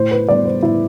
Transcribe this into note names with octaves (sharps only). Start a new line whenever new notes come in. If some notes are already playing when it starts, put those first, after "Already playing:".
Already playing: A2 C5
B4
G3 B3 D5
C5
A2 E4